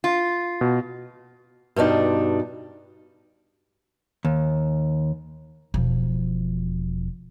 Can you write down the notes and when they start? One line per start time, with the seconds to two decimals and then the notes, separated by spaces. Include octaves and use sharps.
0.04 F4
0.61 B2
1.76 G2 B2 D4 D#4
4.25 D#2
5.74 E1 F3